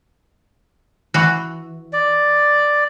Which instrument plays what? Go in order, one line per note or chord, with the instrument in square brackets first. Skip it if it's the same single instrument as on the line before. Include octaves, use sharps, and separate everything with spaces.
[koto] E3 F#4
[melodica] D5